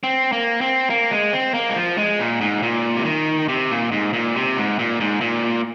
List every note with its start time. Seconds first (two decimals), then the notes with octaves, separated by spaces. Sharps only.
0.04 C4
0.32 A#3
0.61 C4
0.90 A#3
1.11 G#3
1.33 C4
1.54 A#3
1.70 G#3
1.76 F3
1.98 G#3
2.19 A#2
2.41 G#2
2.63 A#2
2.97 C3
3.05 D#3
3.49 C3
3.71 A#2
3.91 G#2
4.13 A#2
4.35 C3
4.57 G#2
4.79 A#2
5.00 G#2
5.21 A#2